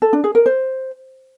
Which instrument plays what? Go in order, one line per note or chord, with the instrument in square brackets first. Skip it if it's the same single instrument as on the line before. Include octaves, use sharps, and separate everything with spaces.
[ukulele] A4
D4
G#4
A#4
C5